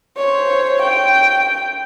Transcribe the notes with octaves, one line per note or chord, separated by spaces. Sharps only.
C5 C#5
G5